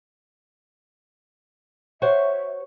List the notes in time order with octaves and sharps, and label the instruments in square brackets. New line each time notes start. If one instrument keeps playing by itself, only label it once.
[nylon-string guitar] F#4 C5 C#5 [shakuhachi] E5